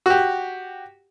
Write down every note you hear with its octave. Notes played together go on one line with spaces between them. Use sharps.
F#4 G4